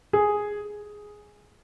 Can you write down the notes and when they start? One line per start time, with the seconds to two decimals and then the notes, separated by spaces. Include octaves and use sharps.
0.13 G#4